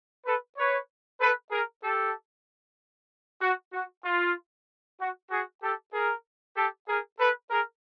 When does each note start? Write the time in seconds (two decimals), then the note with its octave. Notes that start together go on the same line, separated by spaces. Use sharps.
0.24 A4 B4
0.56 B4 C#5
1.19 A4 B4
1.50 G#4 A#4
1.82 G4 A4
3.41 F#4
3.72 F#4
4.03 F4
4.98 F#4
5.30 F#4 G#4
5.61 G4 A4
5.92 G#4 A#4
6.56 G4 A4
6.87 G#4 A#4
7.19 A4 B4
7.50 G#4 A#4